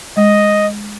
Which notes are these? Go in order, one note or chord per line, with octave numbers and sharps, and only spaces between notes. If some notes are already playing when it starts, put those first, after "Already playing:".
G#3 D#5